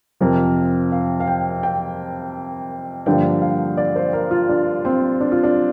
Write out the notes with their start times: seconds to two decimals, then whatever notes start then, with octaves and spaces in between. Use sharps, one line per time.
0.21 F2 C3 F3 A#4
0.92 F5
1.20 F5
1.28 G5
1.63 G5
3.06 G2 D3 F3 A#3 G5
3.42 F5
3.77 D5
3.96 C5
4.13 A#4
4.31 F4
4.49 D4
4.85 C4
5.21 D4
5.32 F4
5.43 D4